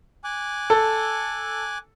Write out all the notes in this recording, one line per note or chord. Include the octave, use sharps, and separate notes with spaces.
G#5 D6 F#6
A4